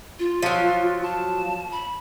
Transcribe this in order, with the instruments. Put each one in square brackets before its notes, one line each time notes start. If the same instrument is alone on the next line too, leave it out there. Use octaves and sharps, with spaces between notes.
[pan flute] F4
[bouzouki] F3 F#3
[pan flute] A5
B5